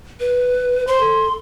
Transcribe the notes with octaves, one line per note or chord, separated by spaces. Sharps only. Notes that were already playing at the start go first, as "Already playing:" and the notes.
B4
C5 C6
A4